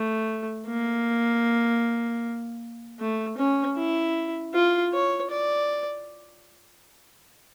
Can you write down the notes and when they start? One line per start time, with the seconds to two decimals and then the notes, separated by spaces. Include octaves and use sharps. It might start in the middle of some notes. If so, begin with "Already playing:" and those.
Already playing: A3
0.67 A#3
2.99 A3
3.38 C#4
3.77 E4
4.54 F4
4.93 C#5
5.31 D5